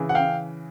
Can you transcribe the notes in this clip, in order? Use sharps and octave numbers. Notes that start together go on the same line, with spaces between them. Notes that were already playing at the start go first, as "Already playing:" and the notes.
Already playing: C#3 E3
F#5
F5 G5